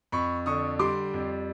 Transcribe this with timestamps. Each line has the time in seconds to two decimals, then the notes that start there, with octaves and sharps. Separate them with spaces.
0.12 F2 B5 C#6
0.46 D3 C#6 D#6
0.79 G3 C6 D6
1.13 F2